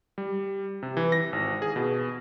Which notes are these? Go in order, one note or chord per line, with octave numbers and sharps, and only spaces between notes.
G3
C3
E3
A#6
G#1
G#4
B2